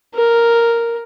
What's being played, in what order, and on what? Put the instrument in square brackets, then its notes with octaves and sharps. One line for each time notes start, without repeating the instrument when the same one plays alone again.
[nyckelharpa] A#4